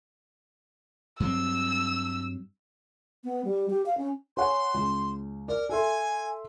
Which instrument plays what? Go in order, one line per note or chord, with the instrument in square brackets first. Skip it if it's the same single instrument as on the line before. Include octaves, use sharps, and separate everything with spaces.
[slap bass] G2 F#3 C4 [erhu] E6
[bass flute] B3
G3
G4
F5
C#4
[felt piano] C#5 F#5 G#5 [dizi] C6
[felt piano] C#2
[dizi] A#4 [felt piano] D5
[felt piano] A4 E5 C6 [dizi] G#5